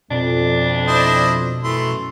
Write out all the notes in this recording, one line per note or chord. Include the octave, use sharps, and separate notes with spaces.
F2 B2 D4
E4 C5 D#5
F#2 E3 A3 C6